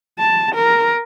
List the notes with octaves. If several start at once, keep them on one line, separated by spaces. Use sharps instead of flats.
A5
A#4